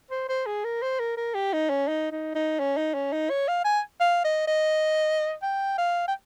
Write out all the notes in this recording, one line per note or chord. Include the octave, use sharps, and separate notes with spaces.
C5
C5
G#4
A#4
C5
A#4
A#4
G4
D#4
C#4
D#4
D#4
D#4
C#4
D#4
C#4
D#4
C#5
F5
G#5
F5
D#5
D#5
G5
F5
G5